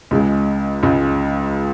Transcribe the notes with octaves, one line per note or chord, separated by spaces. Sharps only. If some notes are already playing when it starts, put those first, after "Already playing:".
C#2 C#3 G#3
C#2 C#3 G#3